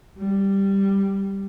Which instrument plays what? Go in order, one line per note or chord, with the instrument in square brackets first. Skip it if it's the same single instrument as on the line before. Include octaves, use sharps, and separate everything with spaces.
[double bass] G3